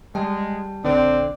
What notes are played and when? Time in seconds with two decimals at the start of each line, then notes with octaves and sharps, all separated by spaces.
0.15 G3 G#3 G5 A5
0.85 A#1 D3 C4 D5